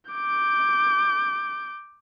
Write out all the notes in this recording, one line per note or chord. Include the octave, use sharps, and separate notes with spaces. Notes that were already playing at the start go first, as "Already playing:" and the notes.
D6 G6